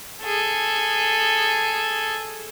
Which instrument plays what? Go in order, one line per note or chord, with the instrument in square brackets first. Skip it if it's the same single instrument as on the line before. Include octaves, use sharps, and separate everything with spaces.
[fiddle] G#4 A4